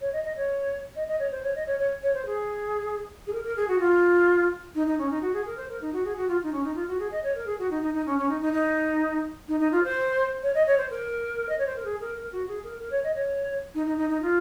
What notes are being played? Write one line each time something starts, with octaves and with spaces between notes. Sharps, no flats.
C#5
D#5
D#5
C#5
D#5
D#5
C#5
C5
C#5
D#5
C#5
C#5
C#5
C5
G#4
G#4
A#4
A#4
G#4
F#4
F4
D#4
D#4
C#4
D#4
F#4
G#4
A#4
C5
A#4
D#4
F#4
G#4
F#4
F4
D#4
C#4
D#4
F4
F#4
G#4
D#5
C#5
A#4
G#4
F#4
D#4
D#4
D#4
C#4
C#4
D#4
D#4
D#4
D#4
D#4
F4
C5
C#5
D#5
C#5
C5
A#4
D#5
C#5
C5
A#4
G#4
A#4
A#4
F#4
G#4
A#4
A#4
C#5
D#5
C#5
D#4
D#4
D#4
D#4
F4